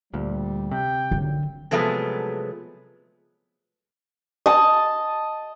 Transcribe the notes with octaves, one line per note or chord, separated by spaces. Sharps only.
D2 A#2 G3
C3 G5
D#2 A#2 D3 F#3
C3 F3 F#3 G#3 A3 B3
D#5 A5